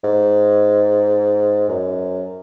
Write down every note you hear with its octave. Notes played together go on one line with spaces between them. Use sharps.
G#2
F#2